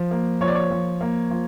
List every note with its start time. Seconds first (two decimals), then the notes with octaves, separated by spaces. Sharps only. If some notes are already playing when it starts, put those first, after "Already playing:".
Already playing: F3
0.11 A#3
0.41 F3 C#5
0.48 D5
0.55 C#5
0.71 F3
1.01 A#3
1.31 F3